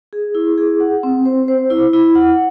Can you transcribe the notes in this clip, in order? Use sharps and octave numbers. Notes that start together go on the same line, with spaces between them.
G#4
E4
G#4
F#5
C4
C5
C5
E4
E4
F#5